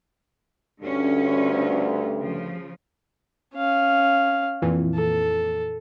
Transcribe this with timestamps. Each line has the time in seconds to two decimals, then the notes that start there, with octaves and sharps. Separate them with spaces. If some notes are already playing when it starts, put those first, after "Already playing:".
0.81 D2 G2 D3 C#4
2.19 C#3 F3
3.56 C#4 F5
4.62 F2 A#2 E3
4.95 A4